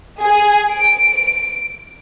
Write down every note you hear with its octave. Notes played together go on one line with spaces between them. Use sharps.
G#4
D7